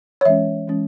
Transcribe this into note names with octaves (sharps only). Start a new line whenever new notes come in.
C#5
E3 G#3 C#4 E5
E3 G#3 C#4